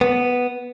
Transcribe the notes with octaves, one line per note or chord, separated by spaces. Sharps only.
B3